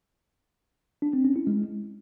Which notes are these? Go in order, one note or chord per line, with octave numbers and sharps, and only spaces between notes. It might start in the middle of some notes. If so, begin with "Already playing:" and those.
D4
C4
C#4
E4
G#3